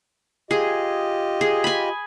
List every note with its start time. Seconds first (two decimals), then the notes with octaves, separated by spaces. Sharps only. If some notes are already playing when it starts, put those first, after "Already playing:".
0.51 F4 G4 G#4 D#5
1.41 G#4
1.64 G#5 B5